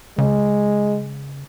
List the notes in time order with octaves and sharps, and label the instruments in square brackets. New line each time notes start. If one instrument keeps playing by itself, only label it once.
[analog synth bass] C#3 [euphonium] G#3